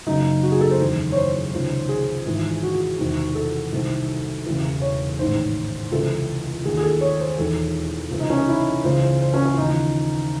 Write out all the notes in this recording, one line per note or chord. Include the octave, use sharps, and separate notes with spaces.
F#1 F#2 C#3 D#4
F#4
G#4
A4
C5
F#1 E2 D#3
C#5
C5
C#2 C3 D#3
G#4
G#1 G#2 E3
F#4
E1 E2 C3 D#3
A4
C2 C3 D#3
E1 E2 C#3 E3
C#5
A1 G#2 D#3 C5
C#2 C3 E3 A4
D#2 D#3 G#4
G#4
A4
C#5
C5
E1 E2 D#3 A4
C#2 C3 E3
D#4
C#4
D#4
E4
C#2 C#3 E3 C5
C5
C5
C#4
C#4
D#2 C#3 E3 D#4